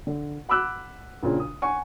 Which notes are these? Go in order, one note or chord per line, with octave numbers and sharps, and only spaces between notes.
D3
F#5 B5 D6 E6 F#6
A#1 A#2 C#3
D#6
F#5 G#5 C#6